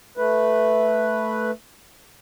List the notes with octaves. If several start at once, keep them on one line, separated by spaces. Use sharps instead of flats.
A3 B4